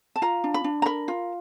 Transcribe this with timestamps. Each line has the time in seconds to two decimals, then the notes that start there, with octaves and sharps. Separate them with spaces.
0.16 A5
0.22 F4 A#5
0.44 D4
0.54 B5
0.64 D4
0.82 A#5
0.86 A#4 B5
1.08 F4